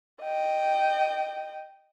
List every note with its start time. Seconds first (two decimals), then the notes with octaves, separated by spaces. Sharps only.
0.22 D#5 G5